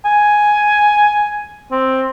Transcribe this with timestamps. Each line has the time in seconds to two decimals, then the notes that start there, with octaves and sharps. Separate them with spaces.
0.05 G#5
1.71 C4